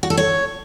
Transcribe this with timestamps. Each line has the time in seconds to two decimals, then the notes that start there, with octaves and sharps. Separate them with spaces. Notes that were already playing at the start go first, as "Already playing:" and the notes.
0.03 F#4
0.10 A4
0.17 C#5